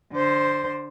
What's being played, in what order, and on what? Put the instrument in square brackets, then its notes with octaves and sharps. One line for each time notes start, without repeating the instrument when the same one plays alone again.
[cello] D3 C5